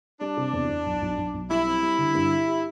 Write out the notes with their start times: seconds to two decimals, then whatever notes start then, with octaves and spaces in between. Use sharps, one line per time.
0.21 G3 D4
0.37 C3
0.53 E2
0.69 E2
0.85 B1
1.02 B1
1.17 B1
1.34 B1
1.50 G3 E4
1.66 C4
1.82 G3
1.98 D3
2.15 G2
2.31 G4
2.47 G4